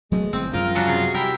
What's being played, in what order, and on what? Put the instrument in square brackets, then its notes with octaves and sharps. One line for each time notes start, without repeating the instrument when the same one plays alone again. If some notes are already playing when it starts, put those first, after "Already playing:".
[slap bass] F#3 A3 B3 [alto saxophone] G#3
[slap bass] G1 E3 [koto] C4
[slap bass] F#2 F3 G#3 [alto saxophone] F4 [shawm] A#4
[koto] C#3 F#3 F#4 [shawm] D4
[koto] C3 [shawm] G#4
[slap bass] G3 [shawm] E4 [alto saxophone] G4 [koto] A#4